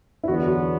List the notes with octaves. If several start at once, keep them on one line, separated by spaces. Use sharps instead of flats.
E4
E2 D3 F#3 B3 F#4
F#4